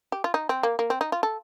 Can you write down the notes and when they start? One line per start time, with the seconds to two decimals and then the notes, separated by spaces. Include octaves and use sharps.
0.12 G4
0.24 F4
0.34 D#4
0.49 C4
0.63 A#3
0.79 A#3
0.90 C4
1.01 D#4
1.12 F4
1.23 A4